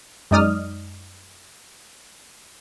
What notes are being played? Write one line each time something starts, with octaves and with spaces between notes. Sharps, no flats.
F#2 G#3 D#4 D5 D#6 F6